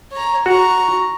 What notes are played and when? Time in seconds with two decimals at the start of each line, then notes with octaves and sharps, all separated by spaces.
0.12 C#5 A#5
0.46 F#4 A#5 C#6